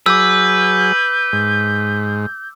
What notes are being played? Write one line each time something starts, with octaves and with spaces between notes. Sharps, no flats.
F#3 G#4 B4 D6 E6 G6
G#2